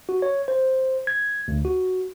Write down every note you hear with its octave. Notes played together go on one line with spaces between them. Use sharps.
F#4
C#5
C5
G#6
D2
F#4